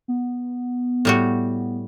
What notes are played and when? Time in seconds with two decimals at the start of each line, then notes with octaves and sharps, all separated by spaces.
0.08 B3
1.05 A2 G3 F#4